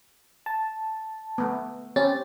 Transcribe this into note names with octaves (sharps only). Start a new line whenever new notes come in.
A5
A3 B3
C4 C#4 G4 A6